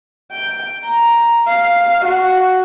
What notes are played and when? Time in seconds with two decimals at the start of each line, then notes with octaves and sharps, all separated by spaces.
0.32 G5
0.84 A#5
1.48 F5
2.05 F#4